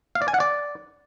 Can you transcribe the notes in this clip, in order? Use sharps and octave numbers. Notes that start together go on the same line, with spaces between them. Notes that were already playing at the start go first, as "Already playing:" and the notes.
F5
D5
G#5
F#5
D5